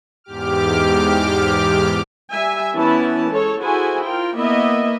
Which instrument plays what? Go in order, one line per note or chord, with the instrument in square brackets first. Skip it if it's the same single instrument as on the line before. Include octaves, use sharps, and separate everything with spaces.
[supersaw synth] E2 G#2 G4 D6 F6
[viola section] G3 E5 G#5
E3 B3 C#4 E4 A5
G#3 A4 C#5
E4 F#4 G#4 A4 C5 G#5
F4 A#4 G5
A#3 B3 E4 D#5 E5